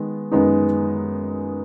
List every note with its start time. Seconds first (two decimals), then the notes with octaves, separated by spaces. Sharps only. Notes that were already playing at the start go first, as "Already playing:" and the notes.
Already playing: D#3 G#3 B3
0.32 F#2 D#3 G#3 B3 D#4